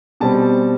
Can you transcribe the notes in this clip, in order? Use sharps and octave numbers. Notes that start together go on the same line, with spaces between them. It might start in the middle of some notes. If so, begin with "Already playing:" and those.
B2 G3 C4 A5